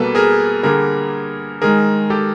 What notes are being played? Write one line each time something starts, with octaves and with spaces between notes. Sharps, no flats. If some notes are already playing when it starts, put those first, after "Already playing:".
Already playing: B2 G3 A#3 A4 B4
G#4 A#4
D3 G3 A#3 G#4 A#4
D#3 G#3 G#4 A#4
G4 A4